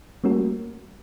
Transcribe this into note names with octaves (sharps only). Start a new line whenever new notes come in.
G3 A3 A#3 C#4 F#4 A#4